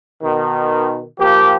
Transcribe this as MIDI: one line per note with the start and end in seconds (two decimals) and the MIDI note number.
0.23 1.06 47
0.23 1.06 51
1.20 1.55 53
1.20 1.55 58
1.20 1.55 67